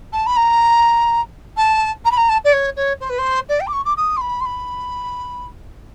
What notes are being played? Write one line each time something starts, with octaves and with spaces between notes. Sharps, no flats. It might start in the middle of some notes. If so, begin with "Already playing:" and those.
A5
B5
A#5
A5
A#5
B5
A#5
A5
D5
C#5
C#5
C5
B4
C5
D5
G5
D6
C#6
D6
D#6
C6
B5
C6
B5